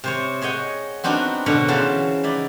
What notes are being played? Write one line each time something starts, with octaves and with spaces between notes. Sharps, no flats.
C3 C5 C#5
G#4 C#5 D#5 F#5 G5
B3 C4 D4 D#4 F#4 A#4
B2 D3 D4 A#4 C#5 F#5
C#3 E3 F#4 C5 A5
D#4 E4 D5